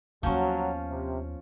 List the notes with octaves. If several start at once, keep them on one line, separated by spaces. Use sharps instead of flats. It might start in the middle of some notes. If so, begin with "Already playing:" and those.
D#2 F3 F#3 B3 C#4
C3